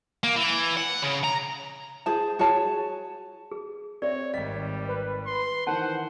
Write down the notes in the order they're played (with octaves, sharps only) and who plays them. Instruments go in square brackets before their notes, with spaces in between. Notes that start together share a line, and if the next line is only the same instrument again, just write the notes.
[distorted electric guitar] A#3
E3
F#5
C#3
A#5
[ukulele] G#4 C5 A5
F#4 G#4 C#5 A5
[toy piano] G#4
[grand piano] C4 [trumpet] C#5 [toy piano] D5 E5
[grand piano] G#1 B6 [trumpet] G3 [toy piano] D#5
[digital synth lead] B4
[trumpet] C6
[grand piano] D#3 E3 [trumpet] C5 [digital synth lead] F#5 [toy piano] A5